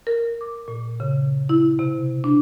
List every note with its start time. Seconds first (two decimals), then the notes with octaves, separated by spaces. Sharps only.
0.07 A#4
0.41 D6
0.68 A#2
1.00 C#3
1.49 E4
1.79 C3
2.24 D4